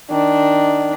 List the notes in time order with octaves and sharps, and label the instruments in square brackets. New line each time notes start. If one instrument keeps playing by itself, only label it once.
[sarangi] D#3 [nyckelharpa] D4